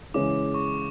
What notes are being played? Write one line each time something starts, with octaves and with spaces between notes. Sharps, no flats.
C#3 E3 G#3 C#4 D6
C#6